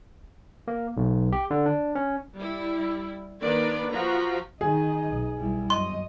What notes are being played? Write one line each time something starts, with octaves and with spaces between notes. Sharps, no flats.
A#3
B1
G4
D3
D4
C#4
G3 E4
D#3 A#3 D4 B4 D5
F3 F#4 A#5
D#3 D#4 G#4 D#5
B1
B1 G3 E4
F#2 D#5 C6